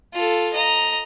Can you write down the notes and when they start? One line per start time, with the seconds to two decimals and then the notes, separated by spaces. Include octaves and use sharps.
0.14 F4 A4
0.54 D#5 A#5